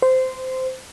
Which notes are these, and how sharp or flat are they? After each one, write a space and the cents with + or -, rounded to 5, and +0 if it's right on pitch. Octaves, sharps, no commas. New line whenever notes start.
C5 -15